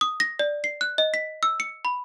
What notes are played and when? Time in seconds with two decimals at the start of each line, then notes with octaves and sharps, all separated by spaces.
0.01 D#6
0.20 A#6
0.39 D5
0.64 C7
0.81 F#6
0.98 D#5
1.14 B6
1.43 E6
1.60 C#7
1.85 B5